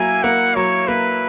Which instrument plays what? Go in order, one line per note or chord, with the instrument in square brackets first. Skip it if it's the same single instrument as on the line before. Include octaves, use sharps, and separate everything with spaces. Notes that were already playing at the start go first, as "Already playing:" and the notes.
Already playing: [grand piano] F#3 A#3 E4 [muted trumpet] G#5
[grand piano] A#3 [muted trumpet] F#5
[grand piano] F#3 [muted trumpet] C#5
[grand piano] A#3 [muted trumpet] B4